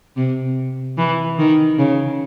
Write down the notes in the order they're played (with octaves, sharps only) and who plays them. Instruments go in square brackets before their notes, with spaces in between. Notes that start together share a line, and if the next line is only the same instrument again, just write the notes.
[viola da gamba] C3
E3
D#3
C#3